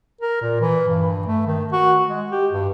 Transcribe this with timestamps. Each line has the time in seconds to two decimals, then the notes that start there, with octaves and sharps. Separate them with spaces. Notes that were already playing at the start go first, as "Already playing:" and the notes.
0.21 A#4
0.42 A#2
0.61 E3
0.88 G2
1.27 A3
1.46 D#3
1.72 F#4
2.08 G#3
2.31 G4
2.51 G2